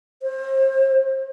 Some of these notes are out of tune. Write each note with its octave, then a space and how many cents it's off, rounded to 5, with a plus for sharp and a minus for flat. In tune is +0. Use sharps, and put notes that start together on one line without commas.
C5 +35